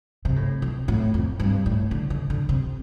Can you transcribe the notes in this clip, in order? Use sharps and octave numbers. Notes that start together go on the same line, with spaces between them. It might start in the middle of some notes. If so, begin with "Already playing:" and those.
C3
A2
C3
A2
F2
G2
A2
D3
D3
D3
C3